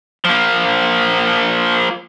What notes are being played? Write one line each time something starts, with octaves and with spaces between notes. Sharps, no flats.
F3 A#3